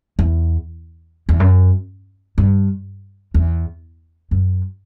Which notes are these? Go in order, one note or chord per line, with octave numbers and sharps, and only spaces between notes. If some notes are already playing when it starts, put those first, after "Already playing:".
E2
E2
F#2
G2
E2
F#2